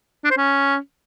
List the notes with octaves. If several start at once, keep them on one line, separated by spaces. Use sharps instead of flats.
D4
C5
C#4